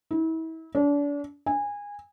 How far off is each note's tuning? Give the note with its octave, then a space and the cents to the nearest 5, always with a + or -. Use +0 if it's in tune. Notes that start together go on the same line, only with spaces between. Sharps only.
E4 -35
D4 -35
G#5 -20